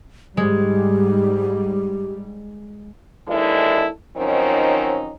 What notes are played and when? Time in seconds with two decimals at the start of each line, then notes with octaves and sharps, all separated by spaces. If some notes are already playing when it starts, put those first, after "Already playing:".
0.37 G#2 G3 G#3 G4
3.28 D#2 E3 G#3 D4 E4 A4
4.17 D#3 F3 F#3 C4 C#4 D#4